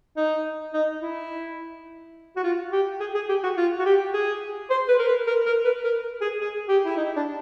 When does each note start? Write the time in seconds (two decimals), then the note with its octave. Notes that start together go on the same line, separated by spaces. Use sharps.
0.17 D#4
0.73 D#4
1.02 E4
2.36 F#4
2.43 F4
2.72 G4
3.00 G#4
3.14 G#4
3.29 G4
3.43 F#4
3.57 F4
3.79 F#4
3.85 G4
4.14 G#4
4.70 C5
4.88 B4
4.99 A#4
5.08 B4
5.27 A#4
5.46 A#4
5.64 B4
5.84 A#4
6.21 G#4
6.40 G#4
6.68 G4
6.85 E4
6.97 D#4
7.16 D4